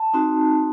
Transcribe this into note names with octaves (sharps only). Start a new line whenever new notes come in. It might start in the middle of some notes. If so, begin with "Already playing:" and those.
Already playing: A5
C4 D#4 F#4